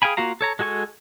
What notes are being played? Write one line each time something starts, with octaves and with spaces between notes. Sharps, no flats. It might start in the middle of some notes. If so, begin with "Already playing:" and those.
G#4 F5 G5 G#5 B5
A#3 F4 F#4 F5 A#5
A4 C#5 A#5
G#3 F#4 A4 G#5 C#6